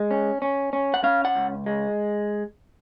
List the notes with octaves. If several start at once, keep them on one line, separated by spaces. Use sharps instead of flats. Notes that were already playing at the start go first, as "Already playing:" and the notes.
Already playing: G#3
C#4
C#4
C#4
F#5
C#4 F5
F#5
C#2
G#3